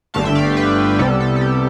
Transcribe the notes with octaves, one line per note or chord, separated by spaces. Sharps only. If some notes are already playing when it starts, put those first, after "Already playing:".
G1 G2 D3 A3 F5 A5
E5 G5
D5 F5
G4
G4 B4
C2 C3 G3 B3 A4
A4
A4
G4